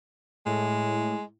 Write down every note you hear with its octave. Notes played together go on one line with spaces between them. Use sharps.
A2 G#3